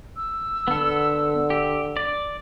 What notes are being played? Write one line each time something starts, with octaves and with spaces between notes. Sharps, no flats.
E6
D3 B3 A4
G4
D5